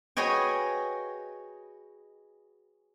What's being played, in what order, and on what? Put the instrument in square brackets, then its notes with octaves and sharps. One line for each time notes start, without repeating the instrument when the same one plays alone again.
[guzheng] F#4 G#4 B4 C#5 D#5 G5